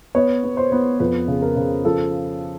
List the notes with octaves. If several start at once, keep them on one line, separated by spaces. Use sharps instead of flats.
B3 C#5
B3
C5
B3
F2 B4
C#3
A#4
C#3
F3 A4